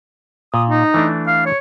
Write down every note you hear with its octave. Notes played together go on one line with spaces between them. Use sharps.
A#2 D#6
D#4
E3 A3 D4
F5
C#5